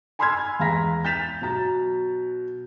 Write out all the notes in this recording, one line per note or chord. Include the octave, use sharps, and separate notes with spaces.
G#5 B5 C6 E6 F6 G#6
E2 G#3 F5 A#5 A#6 B6
G6 A6 B6 E7 F7
B2 F#3 A#5 A6